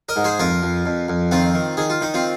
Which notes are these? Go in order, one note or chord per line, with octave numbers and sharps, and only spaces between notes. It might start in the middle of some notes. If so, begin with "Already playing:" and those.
A#4 D#5
G#2
G#4 C5
F2 F4 A#4
F2
F2
F2
D#3 C4 F4
D#3
D#3 G#4
F4
D#3 D#4
C4 F4